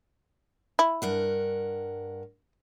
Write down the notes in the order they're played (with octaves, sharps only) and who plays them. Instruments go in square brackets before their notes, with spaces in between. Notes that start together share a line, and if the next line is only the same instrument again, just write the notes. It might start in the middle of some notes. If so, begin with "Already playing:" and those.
[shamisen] E4
[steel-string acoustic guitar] G2 A#4 F#5